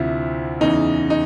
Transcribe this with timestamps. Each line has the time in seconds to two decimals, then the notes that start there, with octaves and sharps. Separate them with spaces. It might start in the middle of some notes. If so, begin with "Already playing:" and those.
Already playing: D2 C3 F3 E4
0.60 E2 C#3 E3 D#4
1.10 D#4